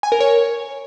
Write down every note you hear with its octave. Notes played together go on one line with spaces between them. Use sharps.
G#5
A#4
C#5